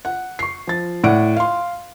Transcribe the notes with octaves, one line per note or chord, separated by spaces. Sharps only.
F#5
C#6 C7
F3 A6
A2 D5 F#5 D7
F5 C6